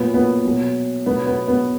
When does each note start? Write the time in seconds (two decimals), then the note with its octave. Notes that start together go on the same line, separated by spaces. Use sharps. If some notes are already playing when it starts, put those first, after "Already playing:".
Already playing: A#2 F#3 B3
0.14 B3
0.45 B2 F#3
1.06 B2 F#3 B3
1.26 B3
1.48 B3